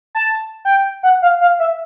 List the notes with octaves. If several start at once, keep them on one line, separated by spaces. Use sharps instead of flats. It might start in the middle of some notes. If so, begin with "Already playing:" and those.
A5
G5
F#5
F5
F5
E5